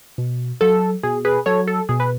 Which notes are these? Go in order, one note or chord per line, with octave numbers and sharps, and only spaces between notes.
B2
F#3 A4
B2 G#4
G#4 B4
F#3 A4 C#5
A4
B2 G#4
B4